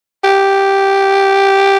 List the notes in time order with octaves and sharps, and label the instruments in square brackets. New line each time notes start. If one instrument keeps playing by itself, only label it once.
[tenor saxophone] G4